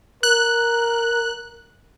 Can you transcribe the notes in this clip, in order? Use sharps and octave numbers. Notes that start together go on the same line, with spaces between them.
A#4 F#6